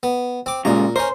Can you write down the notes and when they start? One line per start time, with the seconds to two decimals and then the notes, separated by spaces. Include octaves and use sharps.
0.03 B3
0.46 C4 D6
0.65 A#2 C#3 G3 G#3 A#5
0.96 C#4 A#4 C5